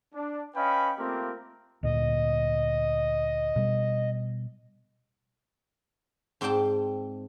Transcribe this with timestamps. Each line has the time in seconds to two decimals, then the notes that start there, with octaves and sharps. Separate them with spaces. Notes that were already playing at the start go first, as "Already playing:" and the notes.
0.13 D4
0.55 C#4 B4 D#5 F5 G5 B5
0.98 A3 A#3 C4 F4 G4 A#4
1.83 D2 A#2 D#5
3.56 B2 G3
6.41 G#2 C4 C5 D5 G5 A5